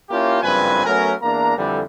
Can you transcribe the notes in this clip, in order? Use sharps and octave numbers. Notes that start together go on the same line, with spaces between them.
A#3 C#4 E4 F4 G4
F#1 G2 F3 C4 B4 G#5
F#3 A3 B3 C#4 A#4
E2 A#3 D4 A#5
F2 D3 E3 G3